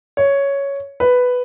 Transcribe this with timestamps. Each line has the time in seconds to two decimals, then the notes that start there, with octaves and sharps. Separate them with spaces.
0.17 C#5
1.00 B4